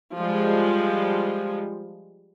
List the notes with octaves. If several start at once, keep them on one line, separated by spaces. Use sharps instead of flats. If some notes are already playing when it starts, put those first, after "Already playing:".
F3 G3 G#3